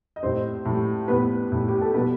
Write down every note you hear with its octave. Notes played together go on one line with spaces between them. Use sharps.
D#5
A2 G3 C4 C5
A2 G3
A2 G3 B3 B4
A2 G3
G4
A4
B2 G3 B3 B4